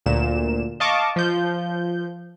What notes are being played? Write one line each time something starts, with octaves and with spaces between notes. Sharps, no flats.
D2 A#2 E7
D#5 F5 A5 C#6 D6
F3 G6